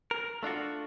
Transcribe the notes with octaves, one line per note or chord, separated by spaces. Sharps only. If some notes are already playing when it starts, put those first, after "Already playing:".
A#4
A3 D4 F4 F#4